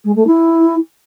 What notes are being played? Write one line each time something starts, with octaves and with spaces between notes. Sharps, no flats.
G#3
A3
E4